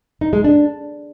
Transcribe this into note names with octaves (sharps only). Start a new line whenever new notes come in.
D#4
G#3
D4